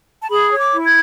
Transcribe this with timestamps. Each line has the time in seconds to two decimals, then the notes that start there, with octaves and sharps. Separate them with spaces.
0.20 A5
0.31 G#4 B5
0.51 C#5
0.58 D6
0.72 E4
0.84 G#6